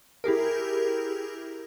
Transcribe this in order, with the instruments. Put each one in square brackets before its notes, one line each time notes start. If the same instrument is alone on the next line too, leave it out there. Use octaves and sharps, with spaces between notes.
[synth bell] E4 G4 G#4 A#4